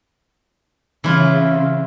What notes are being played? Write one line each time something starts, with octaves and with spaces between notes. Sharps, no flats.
C#3 E3 E4 F4